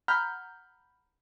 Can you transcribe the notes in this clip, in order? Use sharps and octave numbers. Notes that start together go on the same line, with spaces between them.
F#5 A#5 B5 F6 G6